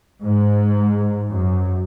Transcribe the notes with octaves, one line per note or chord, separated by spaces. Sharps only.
G#2
F#2